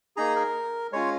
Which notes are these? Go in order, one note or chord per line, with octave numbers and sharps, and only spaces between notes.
A#3 D#4 G#4 A#5
A#4
G#3 C#4 F4 C#5